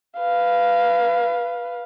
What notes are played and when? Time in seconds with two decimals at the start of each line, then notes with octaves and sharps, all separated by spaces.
0.18 B4 F5